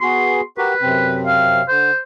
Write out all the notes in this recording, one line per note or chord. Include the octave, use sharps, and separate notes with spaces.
B3 F#4 G#4 C6
F#4 G4 A#4 B4
F#2 C3 C4
F5
D3 C5